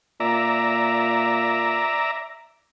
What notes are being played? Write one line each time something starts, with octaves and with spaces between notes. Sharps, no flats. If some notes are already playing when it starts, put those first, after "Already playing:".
A#2 D5 E5 A#5